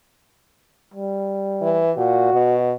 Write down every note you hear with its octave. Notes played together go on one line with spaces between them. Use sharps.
G3
E3
A#2 F#4
B2